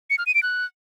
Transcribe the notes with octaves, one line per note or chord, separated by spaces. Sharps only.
C#7
F6
D#7
D7
F#6